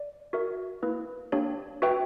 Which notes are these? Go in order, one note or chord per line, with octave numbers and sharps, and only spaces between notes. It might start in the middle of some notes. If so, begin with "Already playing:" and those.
Already playing: D5
F#4 A#4 E5
A#3 E4 B4
A#3 D4 G4 C#5
F#4 B4 E5 G5